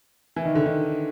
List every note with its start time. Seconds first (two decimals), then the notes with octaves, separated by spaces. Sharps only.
0.36 E3
0.45 D#3
0.55 D3
0.66 D#3